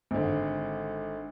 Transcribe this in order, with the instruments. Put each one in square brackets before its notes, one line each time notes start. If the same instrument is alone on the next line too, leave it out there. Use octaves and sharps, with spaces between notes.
[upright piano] G#1 D3